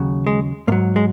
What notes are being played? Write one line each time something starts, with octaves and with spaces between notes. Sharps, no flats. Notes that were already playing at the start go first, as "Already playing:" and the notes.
Already playing: D#2 C#3 F#3
G#3
G#2 F#3 A#3
G#3